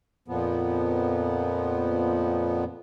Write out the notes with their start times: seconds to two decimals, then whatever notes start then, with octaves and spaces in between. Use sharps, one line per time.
0.28 F2 A#2 F3 B3